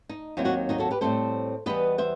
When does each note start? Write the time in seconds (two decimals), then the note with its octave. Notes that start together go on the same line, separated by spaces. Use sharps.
0.09 D#4
0.37 D#2 D#3 F#3 C4 E4
0.45 D#4 F#4
0.69 D#4 F#4
0.79 F#4 A4
0.91 G4 B4
1.01 A2 G3 C4 A4 C5
1.66 E2 D#3 G3 B3 B4 D#5
1.98 C5 E5